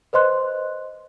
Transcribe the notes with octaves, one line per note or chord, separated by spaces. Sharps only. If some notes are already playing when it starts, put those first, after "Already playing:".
B4 C5 D#5 C6 F#6